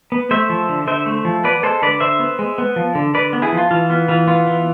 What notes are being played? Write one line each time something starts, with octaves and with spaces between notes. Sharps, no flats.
B3
A3 C5 E5
F3
D3
D3 C5 E5
A3
F3
B3 B4 D5
G#3 A4 C5
D3 B4 D5
D3 C5 E5
B3
G#3
B3
F3
D3
D3 B4 D5
B3
E4 G#4
F3 F4
E3 F4
B3 F4
E3 F4
B3 F4
E3